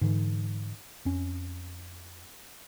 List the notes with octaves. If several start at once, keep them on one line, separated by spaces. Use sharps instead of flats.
G#2 D3 E3
F2 C#4